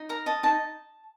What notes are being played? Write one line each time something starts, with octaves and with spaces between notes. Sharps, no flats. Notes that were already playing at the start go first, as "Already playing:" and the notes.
Already playing: D#4
A#4 A#5
D#5 A5
D#4 A5